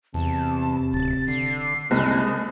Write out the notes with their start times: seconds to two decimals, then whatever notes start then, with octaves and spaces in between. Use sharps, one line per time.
0.14 E2 C3 A5
0.93 D1 A6
1.28 D3 C7
1.91 F#1 C2 G#3 F#6